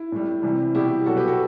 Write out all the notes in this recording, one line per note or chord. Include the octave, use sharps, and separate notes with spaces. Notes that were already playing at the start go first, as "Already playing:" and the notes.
Already playing: E4
A2 G3
C3 E3 G3
B2 G3 E4 G4
B2 F#3 F#4 A4
G4 B4
F#4 A4